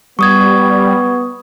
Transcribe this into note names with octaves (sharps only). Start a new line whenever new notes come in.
G3 B3 C#6 D#6 G#6